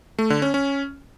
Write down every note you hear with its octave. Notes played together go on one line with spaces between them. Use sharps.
A3
D3
C#4
C#4